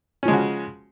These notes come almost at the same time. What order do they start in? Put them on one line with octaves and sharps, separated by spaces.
C#4 F3 G#3 C#3 F#4